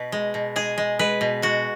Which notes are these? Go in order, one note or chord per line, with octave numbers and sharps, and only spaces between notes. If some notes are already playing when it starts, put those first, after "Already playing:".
Already playing: B2 B4
G#3
B2
G#3 G#4
G#3
G#3 B4
B2
G#3 F#4